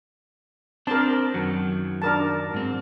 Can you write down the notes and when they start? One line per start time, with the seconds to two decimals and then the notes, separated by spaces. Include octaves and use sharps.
0.87 C4 D4 A#4 C5 A5
1.34 F#2 D#3 F#3
2.02 D4 A#4 A5
2.54 G#2 C4